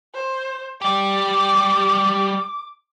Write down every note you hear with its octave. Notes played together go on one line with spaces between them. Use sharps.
C5
G3 G4 D6